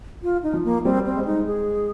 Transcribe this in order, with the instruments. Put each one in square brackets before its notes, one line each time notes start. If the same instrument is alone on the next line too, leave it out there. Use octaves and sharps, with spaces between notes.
[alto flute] F4
D#4
[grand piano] F3
[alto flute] A#3
[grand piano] G3 [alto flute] C4
[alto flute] C4
[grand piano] G#3
[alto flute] D#4
G#4